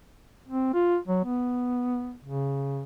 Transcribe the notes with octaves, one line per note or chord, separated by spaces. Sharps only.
C4
F4
F#3
B3
C#3